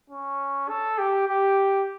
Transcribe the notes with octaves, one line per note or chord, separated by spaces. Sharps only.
C#4
A4
G4
G4